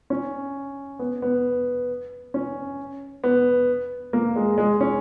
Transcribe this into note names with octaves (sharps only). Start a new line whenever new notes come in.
C#4
B3
B3
C#4
B3
A#3
G#3
G#3
C#4